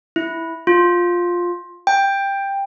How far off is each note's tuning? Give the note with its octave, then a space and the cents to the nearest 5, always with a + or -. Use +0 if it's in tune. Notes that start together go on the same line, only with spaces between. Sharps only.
E4 -5
F4 +10
G5 +10